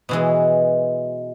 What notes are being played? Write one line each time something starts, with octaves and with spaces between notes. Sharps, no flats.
B2 E3 G#3